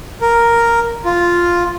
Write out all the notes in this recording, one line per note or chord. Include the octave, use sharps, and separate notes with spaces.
A#4
F4